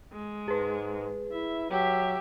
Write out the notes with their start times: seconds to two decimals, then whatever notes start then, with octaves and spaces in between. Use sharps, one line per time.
0.13 G#3
0.48 G#2 G#4 B4
1.32 E4 E5
1.71 F#3 G4 E5